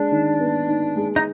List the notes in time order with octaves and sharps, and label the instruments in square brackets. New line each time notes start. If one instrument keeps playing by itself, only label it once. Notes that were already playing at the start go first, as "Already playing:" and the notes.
Already playing: [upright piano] G#3 [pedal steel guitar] D4
[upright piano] D#3
B3
D#4
G#3
[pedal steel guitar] D#4